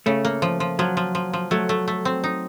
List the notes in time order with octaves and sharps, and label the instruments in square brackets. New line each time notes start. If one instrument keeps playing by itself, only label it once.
[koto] C#3 [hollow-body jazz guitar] A3
[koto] A#3
F3
F3
[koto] F3 [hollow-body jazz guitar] F#3
[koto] F3
F3
F3
[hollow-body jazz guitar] F#3 [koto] A3
[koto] A3
A3
C4
D#4